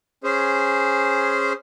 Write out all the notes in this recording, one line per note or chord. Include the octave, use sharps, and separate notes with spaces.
C#4 G#4 C5